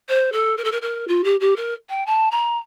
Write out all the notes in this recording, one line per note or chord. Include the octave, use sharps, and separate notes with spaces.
C5
A4
A#4
A4
A#4
A#4
F4
G4
G4
A#4
G5
A5
A#5